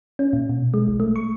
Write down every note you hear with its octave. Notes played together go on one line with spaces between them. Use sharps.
C#4
A#2
B2
G#3
A#1
A3
C#6